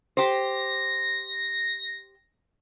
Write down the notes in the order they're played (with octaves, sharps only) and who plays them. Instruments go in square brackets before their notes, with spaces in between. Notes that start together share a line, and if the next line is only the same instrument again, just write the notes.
[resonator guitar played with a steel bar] G4 C5 [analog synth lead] A#6